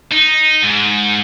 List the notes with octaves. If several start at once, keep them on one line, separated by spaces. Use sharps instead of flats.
D#4
G#2